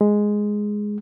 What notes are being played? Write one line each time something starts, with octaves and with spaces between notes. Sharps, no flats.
G#3